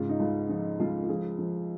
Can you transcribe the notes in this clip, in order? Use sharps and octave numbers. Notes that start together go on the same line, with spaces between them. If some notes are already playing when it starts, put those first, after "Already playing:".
Already playing: G#2 C#3 F4
D#4
C#2 F4
F3 D#4
C#2 F4
F4
F3 G#4
F3